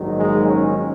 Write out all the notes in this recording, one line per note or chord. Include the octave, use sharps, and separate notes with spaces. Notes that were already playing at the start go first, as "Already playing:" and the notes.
Already playing: A#1 G#2 D#3 F#3
G#3
C#4